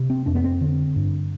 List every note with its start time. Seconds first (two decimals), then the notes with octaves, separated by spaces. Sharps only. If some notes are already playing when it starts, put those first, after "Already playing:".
Already playing: C3
0.10 C4
0.26 F2 D4
0.35 B3
0.44 C4
0.61 D3
0.96 G2